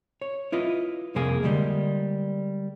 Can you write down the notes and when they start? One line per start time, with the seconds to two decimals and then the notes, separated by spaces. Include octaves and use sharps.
0.22 C#5
0.52 E4 F4 B4 D#5
1.15 C2 F2 C3 A#3 G#4 F5
1.43 D3 G3 G#3 A#3